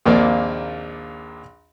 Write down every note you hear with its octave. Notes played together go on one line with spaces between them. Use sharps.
A#1 D#2 A#3 C4 D5